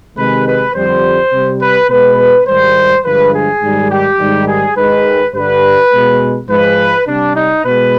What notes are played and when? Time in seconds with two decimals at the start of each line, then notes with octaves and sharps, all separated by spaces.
0.17 C3 D#3 G#3 B4
0.46 B4
0.75 F2 D3 G3 C5
1.32 C3 G3
1.61 B4
1.89 B2 G#3 B4
2.47 G#2 D#3 G3 C5
3.04 G2 D3 F3 G#3 B4
3.33 G#4
3.62 G#2 D#3 G3
3.90 G4
4.19 G#2 D#3 G3
4.48 G#4
4.76 G#2 D#3 G#3 B4
5.34 G2 D3 G3 B4
5.91 B2 G#3
6.49 G#2 F3 G#3 B4
7.06 C3 G3 D4
7.35 D#4
7.64 B2 G#3 B4